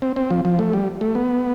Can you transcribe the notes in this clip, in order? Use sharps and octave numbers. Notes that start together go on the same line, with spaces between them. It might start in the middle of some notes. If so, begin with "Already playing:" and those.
C4
C4
F3
F3
A3
G3
A3
B3